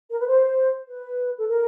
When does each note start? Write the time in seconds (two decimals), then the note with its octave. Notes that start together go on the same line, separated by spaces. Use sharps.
0.11 A#4
0.19 B4
0.27 C5
0.88 B4
1.39 A4
1.48 A#4